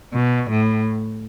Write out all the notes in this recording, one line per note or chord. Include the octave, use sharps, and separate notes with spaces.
B2
A2